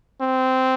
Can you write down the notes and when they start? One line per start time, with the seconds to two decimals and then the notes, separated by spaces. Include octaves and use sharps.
0.21 C4